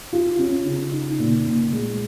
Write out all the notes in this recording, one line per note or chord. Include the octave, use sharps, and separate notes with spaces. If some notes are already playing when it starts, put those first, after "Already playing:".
F4
C#4
C#3
D#4
A#2
A#2
G#3